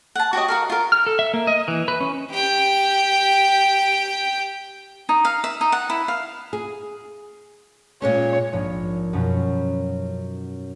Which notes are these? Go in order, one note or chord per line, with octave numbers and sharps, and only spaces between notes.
F#5 A5
F#4 G4 C#5 D#5
F#4 A#4 F5
F4 A#4
F6
A4
E5
A#3
D#5
E3
B4
C#4
G4 G5
D#4
F5
E5
D#4
F#5
E4
F5
G#4
A#2 G#3 C#4 C#5
A#1 G#2
F#2 B2 B3 C#4 F4